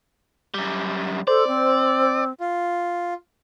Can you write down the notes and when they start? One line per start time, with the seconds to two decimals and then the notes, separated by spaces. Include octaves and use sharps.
0.54 F#2 G3
1.28 A4 C5 D5
1.47 C4
2.40 F4